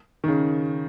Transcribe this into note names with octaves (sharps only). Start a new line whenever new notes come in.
D#3
C#3